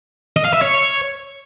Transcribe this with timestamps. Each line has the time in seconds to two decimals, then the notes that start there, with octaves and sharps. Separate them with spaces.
0.37 D#5
0.45 F5
0.53 E5
0.62 C#5